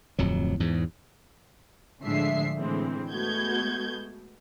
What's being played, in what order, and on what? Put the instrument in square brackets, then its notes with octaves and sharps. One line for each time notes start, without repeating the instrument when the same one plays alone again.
[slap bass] D1 F2 F#3
E2 G#2
[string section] A2 D3 F3 G#3 E5 C7
A2 D3 E3 G#3 C4
G#3 A3 B3 F#4 G6 G#6